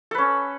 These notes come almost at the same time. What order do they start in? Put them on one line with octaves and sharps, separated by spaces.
A4 B4 C#4